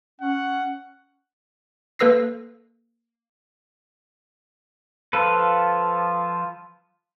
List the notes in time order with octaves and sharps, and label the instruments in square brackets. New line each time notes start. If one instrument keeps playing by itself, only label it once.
[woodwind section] C#4 [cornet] F#5
[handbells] A#3 A4 B4 E6 A#6 C7
[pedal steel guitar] F3 F4 A4 B4